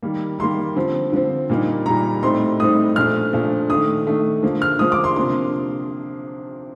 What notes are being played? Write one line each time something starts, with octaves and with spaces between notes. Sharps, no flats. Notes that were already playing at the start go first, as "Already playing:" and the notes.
D#3 G3 A#3
D#3 G3 A#3 C6
D3 F3 C4
D3 F3 C4
A#2 G3 A#3 D#4
A#2 G3 A#3 D#4 A#5
A2 G3 C4 D#4 C6
A2 G3 C4 D#4 D#6
A#2 F3 A3 D4 F6
A#2 F3 A3 D4
D#3 A3 D4 D#6
D#3 A3 D4
D3 F3 A#3
F6
D3 F3 A#3 D#6
D6
C6
C3 F3 A#3 D4 C6